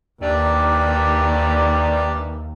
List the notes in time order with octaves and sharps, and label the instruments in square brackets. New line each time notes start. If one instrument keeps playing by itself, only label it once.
[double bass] D#2 [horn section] D#3 E3 G3 [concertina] D4 G4 D5